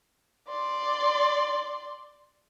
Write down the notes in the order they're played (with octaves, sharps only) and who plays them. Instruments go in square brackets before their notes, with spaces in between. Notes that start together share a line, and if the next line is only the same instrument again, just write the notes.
[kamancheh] D5 C6